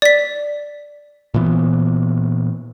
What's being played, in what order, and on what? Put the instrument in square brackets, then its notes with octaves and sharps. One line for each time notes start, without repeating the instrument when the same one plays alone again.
[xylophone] D5 B6
[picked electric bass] A#2 E3 B3